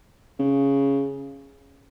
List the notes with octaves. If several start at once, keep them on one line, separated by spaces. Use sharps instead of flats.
C#3